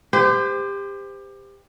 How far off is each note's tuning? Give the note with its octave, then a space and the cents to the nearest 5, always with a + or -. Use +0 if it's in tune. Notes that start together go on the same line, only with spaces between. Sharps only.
G4 +25 C5 -30